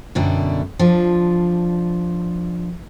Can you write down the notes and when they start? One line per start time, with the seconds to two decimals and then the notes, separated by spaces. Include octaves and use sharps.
0.15 F#2 B2 D3 G3 E4
0.79 F3 D4 F4